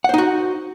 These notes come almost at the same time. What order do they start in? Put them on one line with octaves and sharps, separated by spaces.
F#5 C5 D#4 F#4